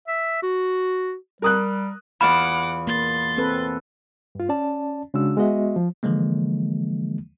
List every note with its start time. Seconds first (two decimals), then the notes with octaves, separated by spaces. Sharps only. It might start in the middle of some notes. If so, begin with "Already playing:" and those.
0.08 E5
0.43 F#4
1.42 G3 A#4 D#6 F#6
2.21 E2 F4 F5 F#5 B5 D6
2.87 A#3 C6 A6
3.38 C4 A4 B4
4.35 G2 F4
4.49 C#4 D5 A5
5.14 C#3 G#3 D4 F#4 E6
5.37 G#3 B3 F#4 D#5 E5
5.76 F3
6.03 D3 E3 F3 G#3 A#3